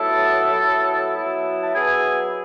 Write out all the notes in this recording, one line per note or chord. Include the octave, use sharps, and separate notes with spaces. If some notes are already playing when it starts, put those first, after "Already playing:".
Already playing: A2 F#3 B3 E4 A4 A5
A2 F#3 B3 E4
F#3 B3 E4
A5
F#3 B3 E4 G#4 G#5